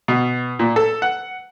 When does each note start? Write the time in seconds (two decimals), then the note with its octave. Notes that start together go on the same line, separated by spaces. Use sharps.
0.08 B2
0.59 A#2
0.76 A4
1.02 F#5